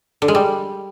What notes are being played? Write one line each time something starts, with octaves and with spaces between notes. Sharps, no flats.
D3
G#3
G3